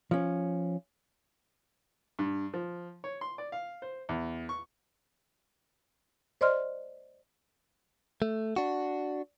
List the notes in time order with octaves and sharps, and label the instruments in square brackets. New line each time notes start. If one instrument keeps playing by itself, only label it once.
[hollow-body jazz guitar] F3 C#4
[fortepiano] G2
F3
C#5
C6
D5
F5
C5
E2
C#6
[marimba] C5 D5 D#5 C6 F6
[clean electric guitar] A3
D4 F#4